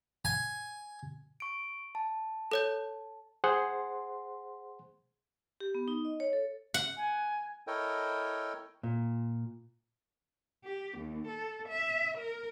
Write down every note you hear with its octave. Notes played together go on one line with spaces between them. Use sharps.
G#5
C#6 D7
A5
A4 C#5 G6
G#4 C5 F#5 C6
G4
B3
D#4
D#5
C#5
A4
F#5
G#5
E4 A4 A#4 C#5 D#5 G5
A#2
G4
D#2
A4
E5
A#4